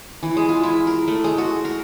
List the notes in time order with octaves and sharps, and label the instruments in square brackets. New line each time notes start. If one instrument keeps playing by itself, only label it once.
[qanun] E3
G#3
F4
E4
A#4
A3
G#3
F#4
A#4